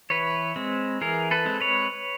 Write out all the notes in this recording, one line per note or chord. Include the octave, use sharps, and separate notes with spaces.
E3 B4 C#5
G#3 C4
E3 G#4 A#4
A4 B4
G#3 C4
B4 C#5